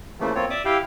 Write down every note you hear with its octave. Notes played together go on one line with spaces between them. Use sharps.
C#3 E3 F3 A3 A#3
A#3 C4 F4 C#5
D5 E5 D6 D#6
E4 G4 F5 G5